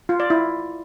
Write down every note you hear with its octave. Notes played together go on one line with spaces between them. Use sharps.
F4
D5
E4